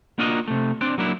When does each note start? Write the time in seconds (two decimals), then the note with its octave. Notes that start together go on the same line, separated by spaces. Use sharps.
0.18 A#3 D4 F4 F#4 A#4 D#5
0.48 C3 A3
0.81 C4 D4 D5
0.98 F#3 A#3 D4 E4